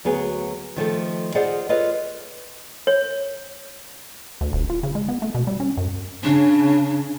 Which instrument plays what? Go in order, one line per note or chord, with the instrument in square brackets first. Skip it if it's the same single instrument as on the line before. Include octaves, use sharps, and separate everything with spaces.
[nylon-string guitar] D2 F#3 B3 G#4
D#3 F3 A3 A4
F4 G#4 C5 D5 D#5 F#5
F4 A4 B4 C#5 D#5
[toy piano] C#5
[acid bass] D2
D#1
F4
C#3
G#3
B3
A3
B2
G3
C#4
F#2
[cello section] C#3 [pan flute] D4